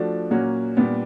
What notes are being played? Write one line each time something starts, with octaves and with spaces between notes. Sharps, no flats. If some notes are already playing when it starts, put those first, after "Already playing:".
Already playing: F3 A3 D4 F#4
A#2 F#3 A#3 C#4 F#4
A#2 G3 B3 D4